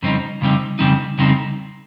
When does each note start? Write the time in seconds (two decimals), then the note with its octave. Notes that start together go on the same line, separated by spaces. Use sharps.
0.02 F2 C#3 G3 C4 D#4
0.41 F2 C#3 G3 C4 D#4
0.79 F2 C#3 G3 C4 D#4
1.18 F2 C#3 G3 C4 D#4